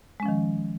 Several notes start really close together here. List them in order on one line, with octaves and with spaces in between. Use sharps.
G#3 C#4 F3 D#3